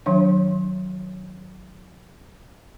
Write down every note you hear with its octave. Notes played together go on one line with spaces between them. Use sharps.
D#3 F#3 D4 C#5